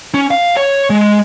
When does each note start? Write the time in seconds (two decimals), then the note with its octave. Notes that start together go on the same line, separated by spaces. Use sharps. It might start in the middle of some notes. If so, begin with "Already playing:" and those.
0.14 C#4
0.31 F5
0.57 C#5
0.90 G#3